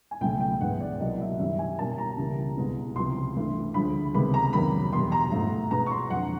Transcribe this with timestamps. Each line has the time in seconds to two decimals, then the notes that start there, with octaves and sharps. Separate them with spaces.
0.11 G#5
0.21 C#2 B2 F#3 A3 G5
0.41 G5
0.60 G#2 E3 G#3 B3 F#5
0.80 D5
1.00 C2 B2 F#3 A#3 D#5
1.20 E5
1.39 F#2 D#3 G3 E5
1.59 G#5
1.79 B2 G3 A#3 A5
1.98 A#5
2.17 C#2 C#3 E3 G3 A#3
2.57 C2 B2 G#3 B3
2.96 C#2 C3 F3 C6
3.36 G2 E3 A3
3.74 D2 D3 F3 G#3 B5
4.14 C#2 C3 D#3 G#3 B3 B5
4.34 A#5
4.53 F2 C3 D#3 F#3 A#3 B5
4.92 E2 B2 G3 C6
5.12 A#5
5.32 G#2 F3 A3
5.71 B2 G#3 B3 A#5
5.86 C#6
5.91 C6
6.10 F2 D3 F#3 F#5